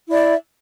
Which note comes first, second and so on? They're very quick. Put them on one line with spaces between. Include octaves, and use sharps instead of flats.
E4 D5 E5